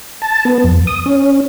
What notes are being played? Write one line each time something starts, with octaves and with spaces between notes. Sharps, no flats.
A5
B3
F2
D#6
C#4